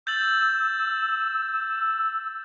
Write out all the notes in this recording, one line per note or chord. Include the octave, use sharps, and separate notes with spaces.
E6 G6 A6 F#7